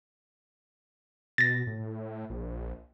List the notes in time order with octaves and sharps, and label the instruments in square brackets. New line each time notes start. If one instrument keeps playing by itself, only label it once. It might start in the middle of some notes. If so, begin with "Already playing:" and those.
[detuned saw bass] B2 [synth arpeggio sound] A6 A#6
[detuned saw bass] A2
A#1